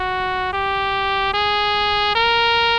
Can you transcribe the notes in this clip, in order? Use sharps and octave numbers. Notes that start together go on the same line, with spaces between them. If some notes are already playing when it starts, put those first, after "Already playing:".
Already playing: F#4
G4
G#4
A#4